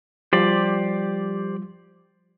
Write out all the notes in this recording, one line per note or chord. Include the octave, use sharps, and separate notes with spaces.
F3 G3 G4 C5 D5